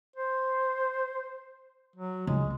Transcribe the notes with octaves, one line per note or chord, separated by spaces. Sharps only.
C5
F#3
C#2 G#3